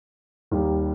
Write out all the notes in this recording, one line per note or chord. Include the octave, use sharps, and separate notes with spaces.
D#2 D#3 G3